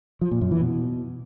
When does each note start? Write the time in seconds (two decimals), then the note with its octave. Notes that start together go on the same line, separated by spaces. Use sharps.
0.21 F3
0.31 A#2
0.41 F#2
0.51 E3
0.61 B2